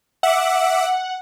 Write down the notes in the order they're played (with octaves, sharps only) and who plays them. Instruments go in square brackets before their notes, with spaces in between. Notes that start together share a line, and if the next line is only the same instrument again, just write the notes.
[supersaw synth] E5 D6 [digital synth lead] F#5